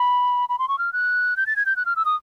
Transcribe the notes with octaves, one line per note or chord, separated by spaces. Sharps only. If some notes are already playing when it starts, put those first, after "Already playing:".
Already playing: B5
B5
C6
C#6
F6
F#6
G6
A6
G#6
G6
F#6
F6
E6
D#6